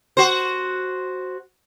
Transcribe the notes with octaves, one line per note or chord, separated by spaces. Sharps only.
F#4 C5